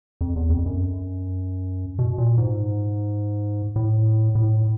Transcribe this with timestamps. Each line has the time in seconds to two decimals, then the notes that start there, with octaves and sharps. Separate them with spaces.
0.21 F2
0.36 E2
0.50 F2
0.66 F#2
1.99 B2
2.18 A#2
2.38 G#2
3.76 A2
4.35 A2